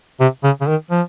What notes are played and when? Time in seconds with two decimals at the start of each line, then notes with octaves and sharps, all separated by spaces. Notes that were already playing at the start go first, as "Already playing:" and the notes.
0.20 C3
0.44 C#3
0.61 C#3
0.68 D#3
0.91 F3